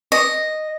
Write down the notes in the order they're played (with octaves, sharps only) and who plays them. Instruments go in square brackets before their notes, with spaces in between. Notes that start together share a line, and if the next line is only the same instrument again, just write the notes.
[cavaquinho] D#5